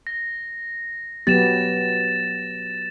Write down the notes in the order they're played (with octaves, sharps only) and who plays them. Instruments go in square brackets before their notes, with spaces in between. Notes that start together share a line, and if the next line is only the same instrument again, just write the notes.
[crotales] A#6
[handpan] F#3 B3 G4 [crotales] A6 E7